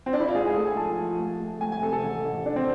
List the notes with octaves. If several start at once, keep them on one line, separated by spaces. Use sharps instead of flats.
C4
D4
E4
F4
G#2 G#4
G#4
A3 A4
G#5
F3 A5
F3
A3
A3
A3 G#5
G#5
C3 A4
A4
A1
A1
A1 D4
C4